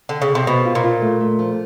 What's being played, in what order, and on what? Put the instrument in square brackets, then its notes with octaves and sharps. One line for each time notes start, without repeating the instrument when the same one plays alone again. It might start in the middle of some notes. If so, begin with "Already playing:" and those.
[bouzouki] D3
C#3
C3
[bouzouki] B2 [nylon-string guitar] C4
[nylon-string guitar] F4
[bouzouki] A#2
[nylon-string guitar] F4
A3
A3
F3